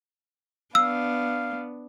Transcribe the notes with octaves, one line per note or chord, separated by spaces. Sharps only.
B3 D4 F5 E6